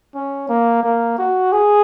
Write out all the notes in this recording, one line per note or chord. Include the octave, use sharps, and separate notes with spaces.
C#4
A#3
A#3
F#4
G#4